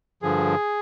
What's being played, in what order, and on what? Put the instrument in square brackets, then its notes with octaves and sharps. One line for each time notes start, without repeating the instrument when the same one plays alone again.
[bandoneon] G2 D3 F3 G#4